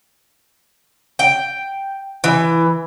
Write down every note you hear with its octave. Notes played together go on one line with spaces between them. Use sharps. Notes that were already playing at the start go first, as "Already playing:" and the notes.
G5
E3